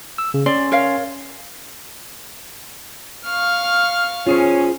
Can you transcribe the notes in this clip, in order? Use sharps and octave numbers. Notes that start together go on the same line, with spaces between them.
E6
C#3
C#4 D5 G#5 C6
A#4 C#5 F5
F5 C#6 F6
C#4 F4 G#4 C5